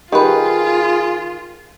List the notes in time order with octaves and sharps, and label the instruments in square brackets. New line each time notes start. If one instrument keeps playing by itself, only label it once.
[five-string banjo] D#3 B4 [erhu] F4 [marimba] G4 [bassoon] G#4